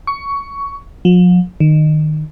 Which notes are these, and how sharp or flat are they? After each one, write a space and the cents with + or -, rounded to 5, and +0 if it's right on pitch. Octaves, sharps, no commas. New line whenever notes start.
C#6 +15
F3 +45
D#3 -20